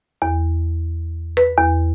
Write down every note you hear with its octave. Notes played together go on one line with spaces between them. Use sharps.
E2
B4
E2